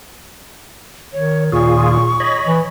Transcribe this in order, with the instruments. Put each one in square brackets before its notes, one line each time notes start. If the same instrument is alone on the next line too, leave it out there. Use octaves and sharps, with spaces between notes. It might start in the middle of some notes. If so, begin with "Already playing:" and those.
[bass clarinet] D#3 [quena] C#5
[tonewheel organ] D#2 F4 G#4 [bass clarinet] A#2 [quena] C#6
[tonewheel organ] C#5 D#5 B5
[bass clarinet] E3